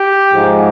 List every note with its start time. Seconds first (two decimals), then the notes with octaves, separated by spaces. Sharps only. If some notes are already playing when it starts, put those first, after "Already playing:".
Already playing: G4
0.33 G#2 F3 G#3